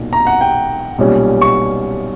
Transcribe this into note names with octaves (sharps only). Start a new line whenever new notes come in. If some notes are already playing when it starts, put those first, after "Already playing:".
Already playing: B1 A#2
A#5
F#5
G5
B1 A#2 G3 C#4
C#6